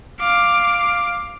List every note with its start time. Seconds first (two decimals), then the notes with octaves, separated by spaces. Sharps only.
0.20 F5 D6